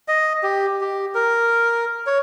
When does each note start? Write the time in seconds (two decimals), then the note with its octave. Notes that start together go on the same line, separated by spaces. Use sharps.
0.08 D#5
0.43 G4
0.81 G4
1.15 A#4
2.07 C#5